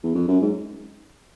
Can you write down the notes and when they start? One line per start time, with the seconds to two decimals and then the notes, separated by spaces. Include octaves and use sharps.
0.03 E2
0.15 F2
0.28 F#2
0.41 G#2